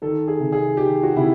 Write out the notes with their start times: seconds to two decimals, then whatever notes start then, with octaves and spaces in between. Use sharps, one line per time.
0.02 D#3 A4
0.28 G#4
0.40 C3
0.52 G#4
0.77 D#3 G4
1.03 F#4
1.16 C3 E4